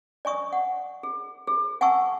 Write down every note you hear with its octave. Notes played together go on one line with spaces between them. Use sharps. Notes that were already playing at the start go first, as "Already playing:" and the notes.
D5 G#5 C#6 D#6
F#5
G#4
G#4
F#5 G#5 A5 C#6 E6